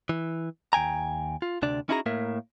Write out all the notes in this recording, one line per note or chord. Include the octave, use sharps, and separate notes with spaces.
E3
D#2 G5 G#5 A#5
F4
D2 C3 D4 D5
C#4 D#4 E4 F#4 G#4 A#5
A2 A#3 A#4 E5